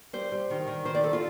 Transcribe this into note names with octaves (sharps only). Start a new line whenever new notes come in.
G3 C5
G3
D#3
D#3
D#3 C5
D5
G3 A4
F4